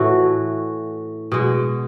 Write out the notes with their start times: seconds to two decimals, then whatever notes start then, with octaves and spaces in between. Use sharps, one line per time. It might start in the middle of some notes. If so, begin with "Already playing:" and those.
Already playing: A2 E3 A3 F#4
1.32 B2 G#3